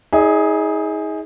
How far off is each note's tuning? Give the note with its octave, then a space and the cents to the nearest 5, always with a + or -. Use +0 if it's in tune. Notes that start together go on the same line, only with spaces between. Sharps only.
D#4 +40 G#4 +0 D5 +0